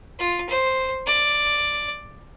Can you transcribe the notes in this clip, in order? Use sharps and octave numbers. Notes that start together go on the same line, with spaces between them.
F4
C5
D5